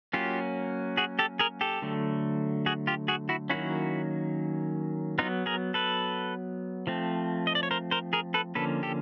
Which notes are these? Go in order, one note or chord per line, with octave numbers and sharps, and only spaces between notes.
F#3 A#3 C#4 F4 G4
F#4 G#4
G4 A4
G#4 A#4
G4 A4
D3 F#3 A3
F#4 G#4
F4 G4
F#4 G#4
E4 F#4
D#3 F#3 A#3 C#4 E4 F#4
F#3 B3 D#4 F4
G#4 A#4
A4 B4
F3 A3 C4
D#5
D5
C#5
A#4 C5
A#4 C5
G#4 A#4
A4 B4
D3 F3 A#3 C#4 A4 B4
G4 A4